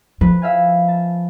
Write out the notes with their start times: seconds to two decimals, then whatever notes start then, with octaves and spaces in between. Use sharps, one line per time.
0.21 F3 B4
0.42 E5 F5 G#5
0.88 A5